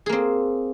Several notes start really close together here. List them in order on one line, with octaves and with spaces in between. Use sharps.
G#4 A#3 C4